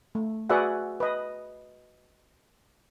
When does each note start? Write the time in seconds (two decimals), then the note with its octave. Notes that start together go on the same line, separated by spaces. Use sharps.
0.15 A3
0.49 F#4 G#4 B4 D5 E5 F#5
1.00 B4 D#5